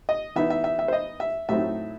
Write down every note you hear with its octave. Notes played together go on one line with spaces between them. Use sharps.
D#5
E3 B3 D#4 E5
E5
E5
E5
C5
D#5
E5
A2 F#3 A3 C4 D#4 E5